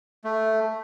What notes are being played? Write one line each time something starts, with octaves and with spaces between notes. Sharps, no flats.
A3